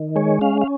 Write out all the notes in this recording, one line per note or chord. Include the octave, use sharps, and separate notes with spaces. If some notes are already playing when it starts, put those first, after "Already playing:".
Already playing: D#3
G#3 C#5
C#4 F5
F5